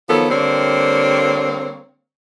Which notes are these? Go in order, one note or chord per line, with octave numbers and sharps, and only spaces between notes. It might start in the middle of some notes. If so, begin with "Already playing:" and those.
D#3 F3 F#3 B3 A4
D3 G3 A#3 C4 C#5